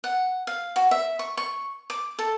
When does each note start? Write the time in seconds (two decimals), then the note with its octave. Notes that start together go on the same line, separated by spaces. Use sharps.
0.04 F#5
0.47 F5
0.76 F#4
0.91 E5
1.19 C#6
1.37 C#6
1.90 D6
2.19 A4